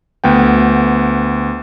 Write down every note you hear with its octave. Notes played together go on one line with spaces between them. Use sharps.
D2 B3 G5